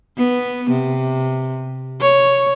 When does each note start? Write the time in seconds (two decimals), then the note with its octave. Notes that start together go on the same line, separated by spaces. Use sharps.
0.18 B3
0.70 C3
2.01 C#5